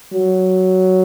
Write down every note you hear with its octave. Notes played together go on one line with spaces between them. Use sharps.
F#3